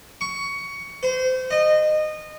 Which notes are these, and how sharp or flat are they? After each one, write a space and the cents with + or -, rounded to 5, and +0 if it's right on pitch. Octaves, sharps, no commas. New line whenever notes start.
C#6 +15
C5 -30
D#5 -20